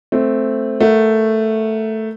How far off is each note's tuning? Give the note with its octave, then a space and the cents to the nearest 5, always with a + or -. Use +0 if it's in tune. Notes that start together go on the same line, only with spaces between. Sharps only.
A3 +0 C4 +0
A3 +0 A#4 +0 F#5 -20